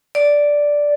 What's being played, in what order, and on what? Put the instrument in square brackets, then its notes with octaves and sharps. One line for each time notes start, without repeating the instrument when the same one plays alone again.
[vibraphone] D5